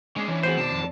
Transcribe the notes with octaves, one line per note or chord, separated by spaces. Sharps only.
G#3 C#4 D4
E3 C#5
A2 B3 C4 F#4 G#4 C5
B2 D#3 D5 A5 C7 D7
F2